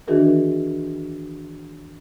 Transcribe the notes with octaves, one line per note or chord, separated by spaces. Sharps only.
D#3 E3 D4 F#4 G#4 A#4